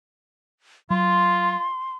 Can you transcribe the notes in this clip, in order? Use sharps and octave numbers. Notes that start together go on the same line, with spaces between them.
F#3 F4 C6